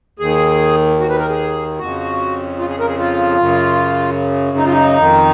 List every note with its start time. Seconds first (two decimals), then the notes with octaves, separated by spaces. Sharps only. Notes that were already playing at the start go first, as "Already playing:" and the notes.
0.19 D#2 D#3 G#4
1.00 F#4
1.09 B4
1.19 A#4
1.29 G#4
1.78 F2 C#3 F#4
2.59 F4
2.69 G#4
2.79 A#4
2.89 G#4
2.99 F4
3.38 F#2 C#3
4.58 D#4
4.65 F4
4.72 D#4
4.98 F2 D#3